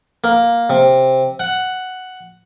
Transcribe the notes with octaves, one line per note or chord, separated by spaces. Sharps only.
A#3
C3
F#5